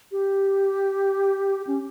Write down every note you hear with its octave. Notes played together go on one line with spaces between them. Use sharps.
G4
C#4